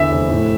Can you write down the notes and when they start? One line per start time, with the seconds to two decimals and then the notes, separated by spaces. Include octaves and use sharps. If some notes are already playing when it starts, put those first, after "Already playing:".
Already playing: E2 D3 E5
0.11 F1
0.30 A2